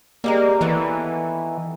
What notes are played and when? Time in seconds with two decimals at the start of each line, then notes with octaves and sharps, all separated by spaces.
0.24 G3 G#3 A#3 A#4
0.61 D#3 E3 B3 A4